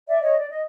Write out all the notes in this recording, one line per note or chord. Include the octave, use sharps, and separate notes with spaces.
D5 E5
C#5 D#5
D5
D#5